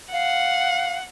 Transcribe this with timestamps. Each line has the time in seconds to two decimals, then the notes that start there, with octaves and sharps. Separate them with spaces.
0.13 F5 F#5